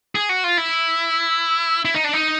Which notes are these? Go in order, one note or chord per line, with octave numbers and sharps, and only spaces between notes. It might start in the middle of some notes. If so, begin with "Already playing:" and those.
G#4
F#4
F4
E4
E4
D#4
D4
D#4